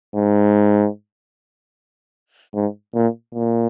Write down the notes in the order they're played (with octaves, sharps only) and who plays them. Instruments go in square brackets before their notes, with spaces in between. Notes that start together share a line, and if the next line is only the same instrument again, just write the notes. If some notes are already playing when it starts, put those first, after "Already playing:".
[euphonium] G#2
G#2
A#2
A#2